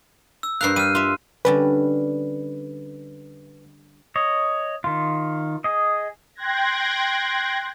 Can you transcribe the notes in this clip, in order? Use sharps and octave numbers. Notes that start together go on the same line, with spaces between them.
E6
G2 A#4 F5 F#6 C7
G3 F6 D#7
F4 E5
D3 G3 C#4 B4
C#5 D#5
D#3 F4
G#4 D#5
G5 C6 F#6 G#6 A#6